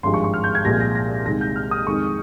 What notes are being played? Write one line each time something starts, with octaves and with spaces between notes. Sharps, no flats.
G#1 G2 F3 G#3 C6
C#6
C#6
F6
G6
G#6
C2 A#2 F3 G#3 A#6
A#6
A#6
C2 C3 D#3 G#3 A#6
G6
F6
D#6
F2 D#3 G#3 C#6